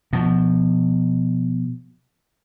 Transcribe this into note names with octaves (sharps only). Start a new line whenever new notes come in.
B2 F3